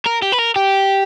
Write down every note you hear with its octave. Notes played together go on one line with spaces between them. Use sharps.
A#4
G4
B4
A#4
G4